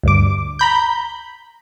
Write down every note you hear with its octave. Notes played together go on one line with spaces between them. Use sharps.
D2 G2 D6
A#5 B5 G6